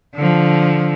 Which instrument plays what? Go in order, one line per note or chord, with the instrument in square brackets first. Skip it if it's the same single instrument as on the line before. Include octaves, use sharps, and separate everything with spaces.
[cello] D3 F3